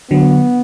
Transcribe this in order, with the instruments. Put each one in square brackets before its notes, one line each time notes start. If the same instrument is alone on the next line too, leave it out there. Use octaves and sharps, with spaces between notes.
[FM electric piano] D3 F#3 [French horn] B3